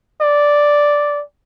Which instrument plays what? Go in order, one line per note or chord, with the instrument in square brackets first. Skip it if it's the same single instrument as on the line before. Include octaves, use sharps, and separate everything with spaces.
[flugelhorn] D5